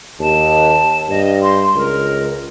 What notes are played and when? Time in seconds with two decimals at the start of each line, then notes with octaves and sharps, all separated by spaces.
0.20 D#2 A5
1.09 G2 D#5
1.42 C6
1.75 C#2 A#4